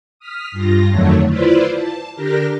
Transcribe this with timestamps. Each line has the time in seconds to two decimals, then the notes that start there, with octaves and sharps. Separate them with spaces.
0.19 D#6 F6 B6
0.52 G2 F4 A#6
0.91 F2 D3 D#3 F#3 A3 C#5
1.28 E4 F4 B4 C5 D5
1.74 A5
2.14 D3 D4 G4 A#4 A#6